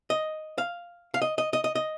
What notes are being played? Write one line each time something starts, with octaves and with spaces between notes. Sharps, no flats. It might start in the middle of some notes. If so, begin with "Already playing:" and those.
D#5
F5
F5
D#5
D#5
D#5
D#5
D#5